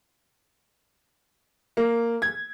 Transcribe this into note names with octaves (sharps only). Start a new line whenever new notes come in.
A#3
G#6